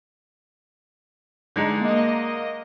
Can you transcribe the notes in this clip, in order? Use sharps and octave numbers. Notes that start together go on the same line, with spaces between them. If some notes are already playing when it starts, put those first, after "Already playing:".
D3 G#3 D#4
A#3 D#5